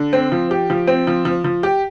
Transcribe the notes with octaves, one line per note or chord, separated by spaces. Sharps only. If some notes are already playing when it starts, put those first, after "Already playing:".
Already playing: D3
C4
F3
G4
F3
C4
F3
F3
F3
G4